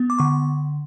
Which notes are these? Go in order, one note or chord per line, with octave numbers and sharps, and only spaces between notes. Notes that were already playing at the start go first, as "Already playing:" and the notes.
Already playing: B3
D6
D3 C#6